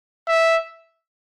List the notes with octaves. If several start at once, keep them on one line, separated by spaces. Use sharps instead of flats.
E5